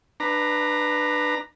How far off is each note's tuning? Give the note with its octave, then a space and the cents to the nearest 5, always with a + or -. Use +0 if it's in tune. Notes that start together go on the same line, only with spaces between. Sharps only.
D4 +30 B4 +0 A#5 +0